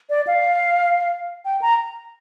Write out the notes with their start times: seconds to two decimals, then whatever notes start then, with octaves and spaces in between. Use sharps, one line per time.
0.10 D5
0.27 F5
1.45 G5
1.62 A#5